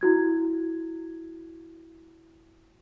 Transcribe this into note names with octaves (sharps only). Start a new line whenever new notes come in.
E4 F#4 G#6